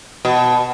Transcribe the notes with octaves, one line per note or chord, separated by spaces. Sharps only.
B2